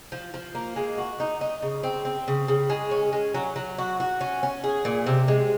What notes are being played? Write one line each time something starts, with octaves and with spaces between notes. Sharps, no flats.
F3
F3
A#3
G#3
F#4
D#4
D#4
C#3
C4
C4
C#3
C#3
G#3
C#4
G#3
F#3
F#3
F#4
F#4
C#4
C#4
G#4
A#2
C3
G#3